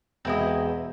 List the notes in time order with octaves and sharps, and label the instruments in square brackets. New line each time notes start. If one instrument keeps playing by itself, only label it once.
[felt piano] E1 G#4 B4 [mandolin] C4 E4 D#5